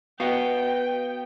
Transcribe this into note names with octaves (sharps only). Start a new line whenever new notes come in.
B3 F#4 B4 D#5 F5 G5